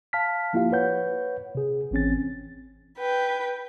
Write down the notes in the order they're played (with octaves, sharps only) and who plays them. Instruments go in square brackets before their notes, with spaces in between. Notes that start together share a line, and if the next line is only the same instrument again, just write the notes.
[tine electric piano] F5 A5 F6 B6
F3 A#3 E4 F4 G4 F5
B4 C#5 F#5 G6
C3 G#4
G#1 E3 C4 C#4 A6
[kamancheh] B4 G5